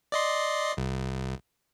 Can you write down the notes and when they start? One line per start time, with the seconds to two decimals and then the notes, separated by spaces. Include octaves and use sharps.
0.12 D5 D#5 C6
0.77 C2